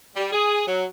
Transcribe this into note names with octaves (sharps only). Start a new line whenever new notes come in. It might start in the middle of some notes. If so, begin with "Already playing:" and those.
G3
G#4
F#3